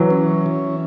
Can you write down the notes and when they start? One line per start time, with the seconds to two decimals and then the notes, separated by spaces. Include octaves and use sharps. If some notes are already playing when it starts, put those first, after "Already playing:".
Already playing: E3 F#3
0.10 C#4
0.46 E3